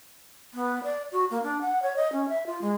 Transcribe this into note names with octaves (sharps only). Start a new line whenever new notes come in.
B3
D5
F#4
A#3
D4
F#5
C#5
D#5
C#4
E5
F4
G#3